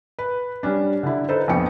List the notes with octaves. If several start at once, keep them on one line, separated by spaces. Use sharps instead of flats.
B4
G3 C#4 D4
D3 E4
D#4 A4 B4 C5
A#1 F2 B3 G5 C#7